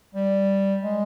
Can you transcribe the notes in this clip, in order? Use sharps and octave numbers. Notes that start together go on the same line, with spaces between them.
G3
G#3